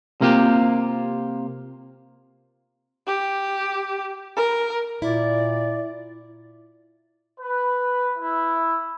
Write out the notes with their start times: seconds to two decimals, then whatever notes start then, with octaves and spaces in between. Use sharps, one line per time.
0.21 C3 A#3 F4 G4
3.07 G4
4.37 A#4
5.02 A#2 E4 D5
7.41 B4
8.18 E4